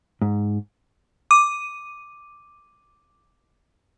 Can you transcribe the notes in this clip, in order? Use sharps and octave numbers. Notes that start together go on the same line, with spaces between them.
G#2
D6 D#7